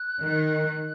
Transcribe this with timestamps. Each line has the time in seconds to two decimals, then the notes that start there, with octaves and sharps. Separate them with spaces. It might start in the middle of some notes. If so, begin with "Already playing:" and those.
Already playing: F#6
0.22 D#3